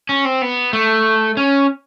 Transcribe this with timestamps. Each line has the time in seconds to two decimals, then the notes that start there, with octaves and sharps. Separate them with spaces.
0.09 C#4
0.25 C4
0.42 B3
0.73 A3
1.37 C#4